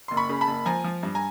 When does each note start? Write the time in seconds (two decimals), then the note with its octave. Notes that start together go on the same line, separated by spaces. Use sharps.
0.08 F#1 C6
0.17 B5 C#6
0.29 C#3
0.41 A5 B5
0.47 F#1
0.66 F3 G#5 A#5
0.84 F3
1.03 G2
1.15 G#5 A#5